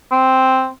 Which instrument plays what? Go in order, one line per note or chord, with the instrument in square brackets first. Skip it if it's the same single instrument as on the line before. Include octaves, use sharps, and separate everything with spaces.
[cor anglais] C4